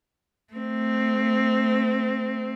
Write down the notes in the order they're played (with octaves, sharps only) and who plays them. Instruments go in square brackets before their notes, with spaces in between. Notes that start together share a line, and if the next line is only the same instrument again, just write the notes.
[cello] A3 C4